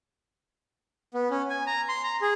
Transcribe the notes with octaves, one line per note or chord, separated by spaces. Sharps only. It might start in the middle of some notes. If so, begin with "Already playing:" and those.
B3
C#4
G#5
A#5
C6
A#5
G#4